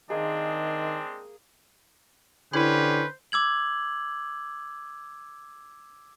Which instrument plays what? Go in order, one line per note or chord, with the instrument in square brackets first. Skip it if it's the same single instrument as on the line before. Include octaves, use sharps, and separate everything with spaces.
[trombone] D#3 [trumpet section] G#3 C4 D4 [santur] A#3 G#4 [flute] D#5
[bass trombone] D3 [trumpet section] C#4 G4 B4 [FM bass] E4 [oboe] C5
[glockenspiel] D6 E6 G#6 F#7